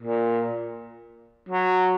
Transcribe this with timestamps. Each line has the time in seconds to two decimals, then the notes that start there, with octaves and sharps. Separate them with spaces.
0.02 A#2
1.49 F#3